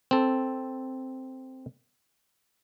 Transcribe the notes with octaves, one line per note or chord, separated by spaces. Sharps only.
C4 A4